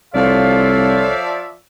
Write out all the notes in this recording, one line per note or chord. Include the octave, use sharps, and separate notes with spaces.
C2 F3 A4 C#5 D5 E5 F5